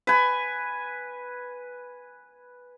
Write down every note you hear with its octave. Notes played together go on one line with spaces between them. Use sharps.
B4 G#5